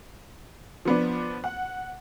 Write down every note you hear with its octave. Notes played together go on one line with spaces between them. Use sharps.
F3 B3 D4
F#5